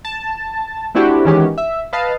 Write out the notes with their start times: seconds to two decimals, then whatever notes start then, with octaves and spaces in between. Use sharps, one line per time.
0.05 A5
0.95 A3 C4 D4 E4 F#4 G4
1.25 D#3 E3 G#3 C#4 F#4 G4
1.58 E5
1.93 B4 D#5 F5 A5